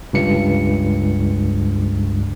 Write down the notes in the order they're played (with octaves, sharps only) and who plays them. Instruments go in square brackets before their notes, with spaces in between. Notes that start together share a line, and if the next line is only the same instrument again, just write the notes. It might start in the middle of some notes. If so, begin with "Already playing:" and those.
[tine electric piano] C#2 G2 C#7